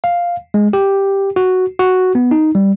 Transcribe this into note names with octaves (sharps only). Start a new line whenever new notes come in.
F5
G#3
G4
F#4
F#4
B3
D#4
G3